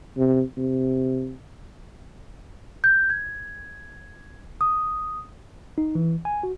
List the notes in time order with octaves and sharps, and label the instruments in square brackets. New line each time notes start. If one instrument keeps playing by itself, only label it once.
[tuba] C3
C3
[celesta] G6
G#6
D#6
[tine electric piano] D#4
E3
G#5
F#4